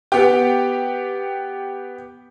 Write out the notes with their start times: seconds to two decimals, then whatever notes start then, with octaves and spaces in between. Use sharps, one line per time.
0.12 B3 G4